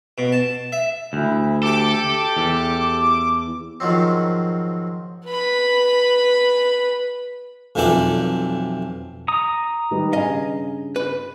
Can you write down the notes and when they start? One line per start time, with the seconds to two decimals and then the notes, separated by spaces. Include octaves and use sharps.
0.18 B2
0.32 A5
0.72 E5
1.13 D2 E4
1.63 G4 A4 D6
2.37 E2
3.80 G#2 D#3 F3 F#3 C4
5.25 B4 B5
7.75 B1 F2 E3 C4 A4 D5
9.28 A#5 D#6
9.91 D#3 G3 B4
10.13 G2 C#3 D#5 F5 G#5
10.96 B4